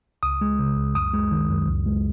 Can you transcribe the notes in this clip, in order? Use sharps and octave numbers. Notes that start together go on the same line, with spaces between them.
C#2 D#6
G#3
C#3
C#2
F#2 D#6
G#3
D#3
F#2
C#2
G#3